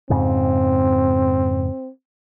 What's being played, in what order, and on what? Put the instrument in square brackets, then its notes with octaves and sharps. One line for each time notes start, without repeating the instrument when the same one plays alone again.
[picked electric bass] F2 G#2 C#3 [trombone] C4